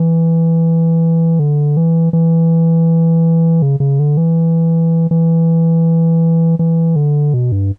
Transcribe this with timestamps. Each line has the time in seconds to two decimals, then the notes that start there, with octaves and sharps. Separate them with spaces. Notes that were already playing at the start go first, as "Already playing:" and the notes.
Already playing: E3
1.39 D3
1.77 E3
2.13 E3
3.62 C#3
3.80 C#3
3.99 D3
4.17 E3
5.11 E3
6.59 E3
6.96 D3
7.34 B2
7.52 G2